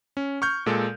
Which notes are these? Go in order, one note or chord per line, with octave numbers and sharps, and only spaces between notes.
C#4
C#6 F6 G6
A#2 G#3 A4